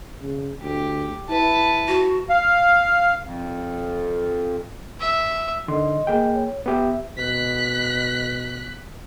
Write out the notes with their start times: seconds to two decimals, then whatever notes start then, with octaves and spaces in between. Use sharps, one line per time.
0.21 C#3
0.62 D2 G4
1.30 E4 B4 A5
1.88 F#4
2.29 F5
3.24 F2
5.00 E5
5.68 D3 D#3 D#5 C6
6.07 A#3 G#4 G5
6.34 C#5
6.66 B3 G4 E5
7.17 B2 F#6 B6